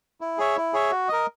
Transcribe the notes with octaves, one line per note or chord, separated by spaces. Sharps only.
E4
G#4 C#5 E5
E4
G#4 C#5 E5
F#4
A#4 D#5